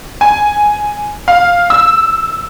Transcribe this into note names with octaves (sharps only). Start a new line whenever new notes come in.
G#5
F5
E6